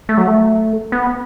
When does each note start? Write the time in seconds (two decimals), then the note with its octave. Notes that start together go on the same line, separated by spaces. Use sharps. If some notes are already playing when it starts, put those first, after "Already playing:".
0.09 A3
0.18 F#3
0.28 A3
0.92 B3